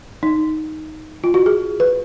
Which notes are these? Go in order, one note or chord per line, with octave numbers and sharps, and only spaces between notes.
D#4
F4
F#4
G#4
B4